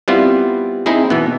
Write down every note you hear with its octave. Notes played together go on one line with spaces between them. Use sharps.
G3 B3 C4 E4 F4
C4 D#4 E4 G#4
B2 E3 B3